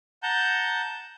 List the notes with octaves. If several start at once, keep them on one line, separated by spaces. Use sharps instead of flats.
F#5 A5 A#5 G6